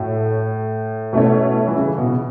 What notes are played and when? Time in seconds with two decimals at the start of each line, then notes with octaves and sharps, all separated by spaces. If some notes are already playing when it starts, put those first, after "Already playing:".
Already playing: A2 A3 F#4 C#5 E5
1.13 B2 A3 C#4 E4 C#5
1.67 E3
1.76 C#3
1.98 B2